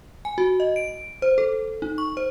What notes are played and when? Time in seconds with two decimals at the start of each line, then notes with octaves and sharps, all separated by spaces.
0.25 G#5
0.38 F#4
0.60 D#5
0.76 D7
1.22 C5
1.38 A4
1.82 D#4
1.98 C#6
2.17 C5